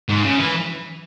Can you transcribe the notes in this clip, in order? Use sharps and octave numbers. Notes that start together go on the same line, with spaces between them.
G#2
C#3
E3